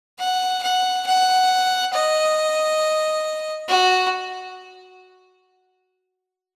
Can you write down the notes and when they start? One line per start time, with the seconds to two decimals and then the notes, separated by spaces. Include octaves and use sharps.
0.19 F#5
0.62 F#5
1.06 F#5
1.94 D#5
3.68 F#4